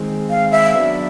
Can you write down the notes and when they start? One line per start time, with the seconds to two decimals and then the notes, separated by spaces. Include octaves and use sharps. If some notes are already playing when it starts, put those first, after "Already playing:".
Already playing: D#3 G#3 C4
0.30 F5
0.51 E5
0.74 F#3 B3 D4